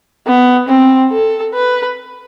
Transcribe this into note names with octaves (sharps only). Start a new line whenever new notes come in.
B3
C4
A4
B4